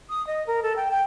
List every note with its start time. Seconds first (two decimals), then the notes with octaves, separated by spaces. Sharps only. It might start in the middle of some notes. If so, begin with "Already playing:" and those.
0.10 D#6
0.27 D#5
0.47 A#4
0.63 A4
0.76 G5
0.91 G5